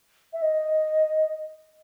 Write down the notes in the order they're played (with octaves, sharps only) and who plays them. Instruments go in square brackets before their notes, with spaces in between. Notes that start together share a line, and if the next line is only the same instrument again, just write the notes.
[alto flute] E5
D#5